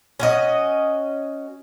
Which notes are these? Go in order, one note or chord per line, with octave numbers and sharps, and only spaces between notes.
C#4 F#4 D#5